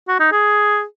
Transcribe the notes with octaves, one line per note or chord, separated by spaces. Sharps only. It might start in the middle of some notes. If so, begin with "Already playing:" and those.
F#4
D#4
G#4